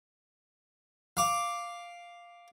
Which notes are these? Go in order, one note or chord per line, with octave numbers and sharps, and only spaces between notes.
F5 D6